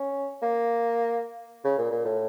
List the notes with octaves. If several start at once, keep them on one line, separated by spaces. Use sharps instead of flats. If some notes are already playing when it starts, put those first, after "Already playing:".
Already playing: C#4
A#3
C#3
A#2
A#2
A2